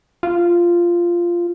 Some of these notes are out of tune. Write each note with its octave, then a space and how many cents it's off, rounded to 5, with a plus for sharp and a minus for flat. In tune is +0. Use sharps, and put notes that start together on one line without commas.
F4 -10